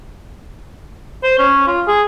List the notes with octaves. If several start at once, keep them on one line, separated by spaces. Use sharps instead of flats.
C5
C#4
F4
G#4